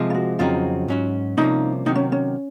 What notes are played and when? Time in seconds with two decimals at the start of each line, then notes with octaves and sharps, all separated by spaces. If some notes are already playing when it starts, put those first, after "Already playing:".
Already playing: C3 F3 G#3
0.10 F4
0.15 F#4
0.39 F2 C#3 F#3 C4 D#4 F4
0.88 G#2 F#3 C#4 F#4
1.37 C2 C3 F3 A#3 C#4 D#4
1.86 C3 D#3 F#3 D#4
1.95 C#4
2.12 C#4